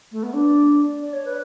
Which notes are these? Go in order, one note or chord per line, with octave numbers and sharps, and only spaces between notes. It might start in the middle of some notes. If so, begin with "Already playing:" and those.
A3
B3
D4
D5
C#5
B4